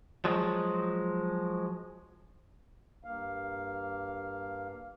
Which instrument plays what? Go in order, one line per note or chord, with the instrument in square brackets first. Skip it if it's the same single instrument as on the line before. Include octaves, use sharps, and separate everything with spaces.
[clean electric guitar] F3 F#3 G#3
[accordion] G2 A#3 F5